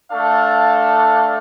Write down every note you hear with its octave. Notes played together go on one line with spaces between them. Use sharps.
A3 D4 A4 F5